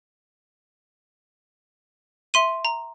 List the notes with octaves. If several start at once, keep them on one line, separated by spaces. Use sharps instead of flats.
E5 C6 D#7
A#5